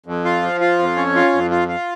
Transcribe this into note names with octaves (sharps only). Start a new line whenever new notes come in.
F2
F4
F3
F4
F2
C#4
F4
F2
F4
F4